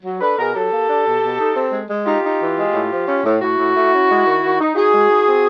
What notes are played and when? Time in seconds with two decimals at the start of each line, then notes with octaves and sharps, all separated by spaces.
0.04 F#3
0.20 D4 A4 B4
0.37 B2 G#4 A#4
0.54 F#3 G4 A4
0.71 A#3
0.88 D4
1.05 B2
1.22 B2
1.38 D#4
1.55 C4
1.72 G#3
1.89 G#3
2.06 D#4 F4 G4
2.23 D#4
2.39 E3
2.56 G#3
2.73 A2
2.90 F3
3.07 C#4
3.23 A2
3.41 A2 E4 F#4
3.57 A2
3.74 A3
3.91 C#4
4.08 G#3
4.24 D#3
4.42 D#3
4.59 D#4
4.75 D#4 F#4 G#4
4.92 G#3
5.09 D#4
5.26 C4